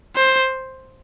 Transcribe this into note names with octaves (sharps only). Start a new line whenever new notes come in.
C5